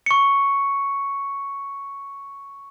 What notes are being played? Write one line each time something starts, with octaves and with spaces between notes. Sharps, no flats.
C#6 C#7